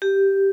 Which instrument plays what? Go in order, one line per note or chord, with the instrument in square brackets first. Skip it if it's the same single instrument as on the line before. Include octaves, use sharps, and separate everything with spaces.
[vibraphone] G4